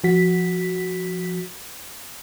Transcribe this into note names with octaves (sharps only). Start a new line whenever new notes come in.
F3 F#4 B6